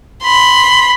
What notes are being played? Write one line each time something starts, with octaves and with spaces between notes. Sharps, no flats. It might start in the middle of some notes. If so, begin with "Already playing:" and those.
B5 C6